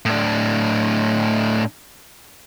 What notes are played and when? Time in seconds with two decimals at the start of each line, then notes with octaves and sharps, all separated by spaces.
0.06 A2 D4